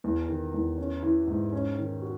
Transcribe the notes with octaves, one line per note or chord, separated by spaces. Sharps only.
E2
D#3
E2
C#4
E3
G#2
C#4
D#3
F#4